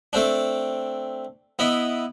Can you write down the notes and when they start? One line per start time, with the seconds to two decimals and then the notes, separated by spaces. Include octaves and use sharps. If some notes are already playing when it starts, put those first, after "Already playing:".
0.13 A3 C4 D4
1.59 B3 E4 D#5